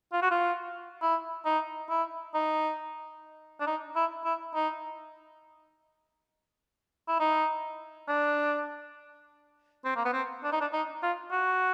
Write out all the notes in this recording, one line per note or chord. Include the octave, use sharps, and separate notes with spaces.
F4
F#4
F4
E4
D#4
E4
D#4
D4
D#4
E4
E4
D#4
E4
D#4
D4
C4
A#3
B3
C4
D4
D#4
D4
D#4
F4
F#4